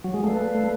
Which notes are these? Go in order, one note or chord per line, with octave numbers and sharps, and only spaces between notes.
F#3
G#3
A3 B4 D5 F5
A3